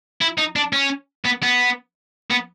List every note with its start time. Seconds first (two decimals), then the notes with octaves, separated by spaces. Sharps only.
0.22 E4
0.38 D#4
0.56 D4
0.73 C#4
1.26 B3
1.43 B3
2.30 B3